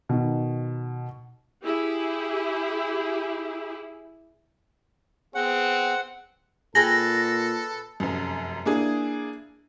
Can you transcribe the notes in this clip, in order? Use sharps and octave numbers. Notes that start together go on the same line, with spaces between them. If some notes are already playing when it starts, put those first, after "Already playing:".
B2 D#3
E4 G4 G#4
B3 C4 G#4 F#5
A#2 G#4 A4 B4 G5 A#6
F1 F#2
A#3 D4 E4 G#4